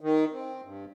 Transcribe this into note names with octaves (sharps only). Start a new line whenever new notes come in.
D#3
C4
G2